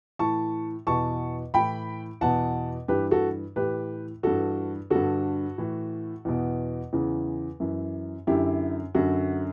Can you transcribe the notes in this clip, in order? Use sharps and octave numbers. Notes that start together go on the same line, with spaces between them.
A2 E3 A5 C#6
E2 B2 A5 C#6
A2 E3 G5 B5
E2 B2 F#5 A5
G2 E3 G4 B4
F#4 A4
A2 E3 G4 B4
G2 E3 F#4 A4
G2 D3 F#4 A4
A2 E3
E2 B2
E2 C#3 E3
F#2 E3
F#2 D3 E4 G4
F#2 D3 F#4